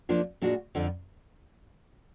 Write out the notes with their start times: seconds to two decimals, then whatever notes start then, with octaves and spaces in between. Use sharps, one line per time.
0.09 F3 A#3 D4 F4
0.42 A#2 G#3 D4 F#4
0.75 F2 D3 F3